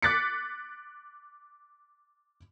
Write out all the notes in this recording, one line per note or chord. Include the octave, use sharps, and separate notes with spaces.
D6 F#6 A6 B6 C#7